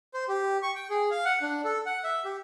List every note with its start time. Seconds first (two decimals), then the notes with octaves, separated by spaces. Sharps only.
0.14 C5
0.28 G4
0.63 C#6
0.75 G5
0.90 G#4
1.11 F5
1.25 F#5
1.41 D4
1.65 A4
1.86 F#5
2.04 E5
2.25 G4